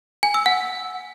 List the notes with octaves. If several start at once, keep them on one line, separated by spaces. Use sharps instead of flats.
G#5
E6
F#5